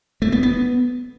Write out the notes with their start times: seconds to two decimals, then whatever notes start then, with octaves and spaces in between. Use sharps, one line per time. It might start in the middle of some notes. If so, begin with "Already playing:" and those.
0.22 A3
0.32 B3
0.43 B3